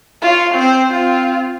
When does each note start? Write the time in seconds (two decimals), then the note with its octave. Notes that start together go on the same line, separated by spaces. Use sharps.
0.22 F4 C#5
0.54 C4 C5
0.91 C4 F4